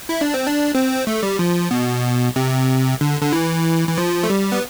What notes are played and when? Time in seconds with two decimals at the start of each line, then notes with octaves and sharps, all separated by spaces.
0.09 E4
0.21 D4
0.34 C4
0.47 D4
0.75 C4
1.07 A3
1.23 G3
1.39 F3
1.71 B2
2.36 C3
3.01 D3
3.21 D3
3.32 E3
3.89 E3
3.98 F3
4.23 A3
4.30 G3
4.52 B3